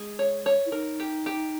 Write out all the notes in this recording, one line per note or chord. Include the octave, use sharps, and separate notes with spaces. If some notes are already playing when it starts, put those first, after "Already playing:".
Already playing: G#3 G#4
C#5
C#5
E4
D#4 A#4
G4
G4